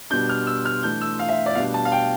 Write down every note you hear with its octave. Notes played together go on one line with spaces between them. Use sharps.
B2 G3 D4 G6
F6
E6
F6
E3 A3 D4 G6
E6
F5
E5
D5
B2 G3 D4 F5
A5
F5
G5